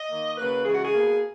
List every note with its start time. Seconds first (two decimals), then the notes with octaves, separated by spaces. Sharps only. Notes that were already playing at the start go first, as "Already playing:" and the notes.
Already playing: D#5
0.10 D#3 A#3
0.38 C#3 F#3 A#3 B4
0.65 C#3 E3 G#3 G#4
0.73 F#4
0.83 G#4
0.93 B2 A#3